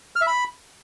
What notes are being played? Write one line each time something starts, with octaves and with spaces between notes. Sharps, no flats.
F6
E5
B5